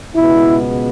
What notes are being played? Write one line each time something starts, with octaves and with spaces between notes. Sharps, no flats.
C#2 B2 G#3 B3 E4